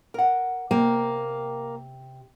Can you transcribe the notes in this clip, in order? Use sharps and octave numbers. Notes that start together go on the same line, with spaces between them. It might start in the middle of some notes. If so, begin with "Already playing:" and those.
A#4 F#5
C3 A#3 G5